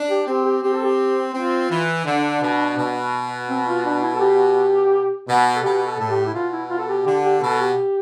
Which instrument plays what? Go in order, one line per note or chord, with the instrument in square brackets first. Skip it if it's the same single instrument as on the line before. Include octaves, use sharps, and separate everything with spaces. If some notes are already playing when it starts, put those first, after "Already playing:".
Already playing: [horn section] D4
[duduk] G4
[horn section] C4 [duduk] G4
[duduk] G4
[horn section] C4 [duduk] G4
[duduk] A4
G4
[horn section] C4 [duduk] F4
[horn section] E3
[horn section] D3 [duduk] D4
[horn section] B2
B2
[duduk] C4
F4
D4
E4
A4
G4
[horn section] B2
[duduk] A4
[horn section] B2 [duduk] G4
[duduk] A4
[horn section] A2 [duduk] A4
[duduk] G4
E4
[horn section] B2 [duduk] F4
[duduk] E4
F4
A4
G4
[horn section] D3 [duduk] G4
[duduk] G4
[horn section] B2 [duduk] A4
[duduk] G4